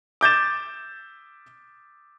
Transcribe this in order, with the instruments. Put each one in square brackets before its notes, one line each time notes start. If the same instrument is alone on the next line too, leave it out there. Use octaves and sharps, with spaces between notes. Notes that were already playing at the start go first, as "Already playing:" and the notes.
[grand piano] D6 G6 A6 E7